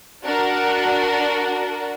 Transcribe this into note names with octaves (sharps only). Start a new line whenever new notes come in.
D4 F#4 A#4